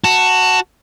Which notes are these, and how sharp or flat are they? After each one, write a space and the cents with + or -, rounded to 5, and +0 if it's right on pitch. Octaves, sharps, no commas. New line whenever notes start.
F#4 +0 A5 +15